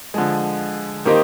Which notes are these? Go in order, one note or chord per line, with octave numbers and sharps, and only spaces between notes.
D3 F3 G#3
D#3 A#3 D#4 G4 C5